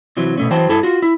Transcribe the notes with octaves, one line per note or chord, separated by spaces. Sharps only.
C3 E3 F#3
B2 A3 C#4
E3 F#3 C5 G5 A5
G2 E4 G#4 A4 A5
F4 F#4
E4